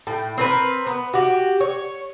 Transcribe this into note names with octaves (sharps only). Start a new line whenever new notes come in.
A2 G5
C4 A#4 B4
B3
F#4 G4
C#5